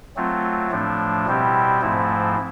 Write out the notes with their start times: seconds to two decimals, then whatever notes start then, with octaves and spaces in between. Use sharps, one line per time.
0.16 F#3 A3 C4 F4
0.71 A2 F3 A3 D4
1.26 B2 G3 C4 E4 G4
1.81 G#2 F3 A3 C4 E4